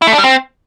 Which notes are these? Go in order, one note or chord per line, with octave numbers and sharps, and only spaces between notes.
E4
A3
D4
G3
C4